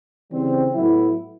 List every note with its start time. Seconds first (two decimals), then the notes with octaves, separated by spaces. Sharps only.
0.31 C#3 E3 G3 C4
0.74 A2 F#3 B3 E4